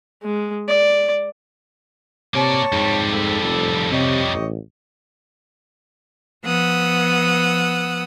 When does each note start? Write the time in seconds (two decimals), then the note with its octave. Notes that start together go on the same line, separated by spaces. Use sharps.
0.23 G#3
0.68 D5
2.34 C3 A#3 C#5 D5 A5
2.72 F2 G#2 G3
3.11 F3 A4
3.42 F1
3.91 C3 G4 C#5 D#5
4.34 A1
6.44 F3 B3 F#5 D#6 E6